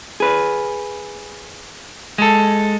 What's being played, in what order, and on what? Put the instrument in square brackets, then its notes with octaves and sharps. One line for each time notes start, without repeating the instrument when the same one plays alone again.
[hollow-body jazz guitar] G#4 B4
[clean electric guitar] G#3 A4